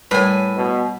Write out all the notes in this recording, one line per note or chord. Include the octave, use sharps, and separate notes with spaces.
A2 G3 A#4 B4 C#5 G#5
B2